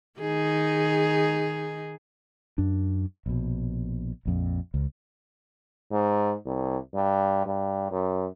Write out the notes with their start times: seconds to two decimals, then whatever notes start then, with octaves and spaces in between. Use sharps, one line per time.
0.20 D#3 D#4 G#4
2.58 F#2 D4
3.26 A#1 B2
4.25 A#1 F2
4.74 C#2
5.91 G#2
6.46 C2
6.95 G2
7.46 G2
7.91 F#2